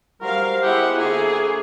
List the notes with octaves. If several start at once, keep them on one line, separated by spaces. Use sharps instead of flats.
G3 F#4 A#4 C5 F5
G#3 B3 E4 G4 E5 F#5
D3 A#3 G#4 A4 E5 G#5 C6 C#6